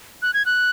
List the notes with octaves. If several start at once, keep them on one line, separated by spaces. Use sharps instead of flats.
F#6
G#6
F#6